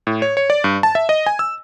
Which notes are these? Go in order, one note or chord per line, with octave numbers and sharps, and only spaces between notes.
A2
C#5
C#5
D5
G2
A5
E5
D#5
G#5
E6